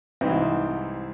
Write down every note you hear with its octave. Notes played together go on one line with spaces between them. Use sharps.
C2 G#2 E3 C4 D#4 E4